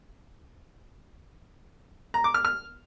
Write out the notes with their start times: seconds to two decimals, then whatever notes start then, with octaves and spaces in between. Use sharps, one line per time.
2.14 A#5
2.24 D6
2.34 F6
2.45 F6